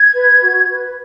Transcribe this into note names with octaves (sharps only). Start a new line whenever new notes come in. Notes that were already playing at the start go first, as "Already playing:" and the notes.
Already playing: G#6
B4
F#4
B4